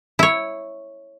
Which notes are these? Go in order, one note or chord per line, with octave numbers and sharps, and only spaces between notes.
E4 C#5